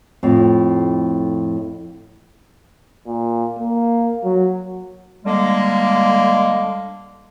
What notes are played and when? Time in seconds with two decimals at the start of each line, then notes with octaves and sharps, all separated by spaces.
0.23 F2 A2
3.07 A#2
3.59 A#3
4.24 F#3
5.25 D3 G3 G#3 A#3